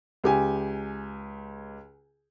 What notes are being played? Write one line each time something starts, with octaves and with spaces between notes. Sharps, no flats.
C#2 G4 G#5